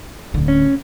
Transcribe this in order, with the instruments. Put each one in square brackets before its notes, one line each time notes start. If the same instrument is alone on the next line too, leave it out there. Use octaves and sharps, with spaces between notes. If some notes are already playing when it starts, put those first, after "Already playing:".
[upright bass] D1 D3
[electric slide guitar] C#4